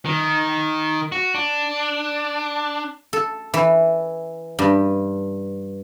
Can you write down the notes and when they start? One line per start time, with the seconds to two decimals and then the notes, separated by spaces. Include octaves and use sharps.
0.05 D#3
1.12 F#4
1.35 D4
3.13 A4
3.54 E3
4.59 G2